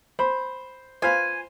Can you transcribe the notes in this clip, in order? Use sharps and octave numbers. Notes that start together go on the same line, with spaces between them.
C5 B5
F4 B4 C5 F5 G#5